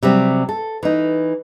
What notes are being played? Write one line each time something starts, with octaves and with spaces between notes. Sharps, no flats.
C3 F#3 G3 C4
A4
E3 D#4